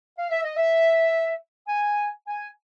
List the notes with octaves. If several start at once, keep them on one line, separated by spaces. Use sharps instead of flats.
F5
E5
D#5
E5
G#5
G#5